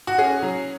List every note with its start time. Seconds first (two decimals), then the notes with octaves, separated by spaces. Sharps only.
0.07 F#4
0.19 C#4 G#4
0.43 F#3